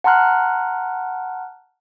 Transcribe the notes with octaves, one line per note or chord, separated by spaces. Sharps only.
F#5 A5 A#5 C6 F6 F#6